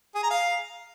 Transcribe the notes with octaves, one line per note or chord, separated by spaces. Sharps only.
G#4
A#5
F5